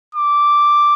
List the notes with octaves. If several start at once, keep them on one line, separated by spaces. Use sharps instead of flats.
D6